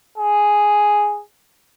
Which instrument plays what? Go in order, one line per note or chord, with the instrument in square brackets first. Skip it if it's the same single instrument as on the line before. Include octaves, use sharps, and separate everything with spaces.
[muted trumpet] G#4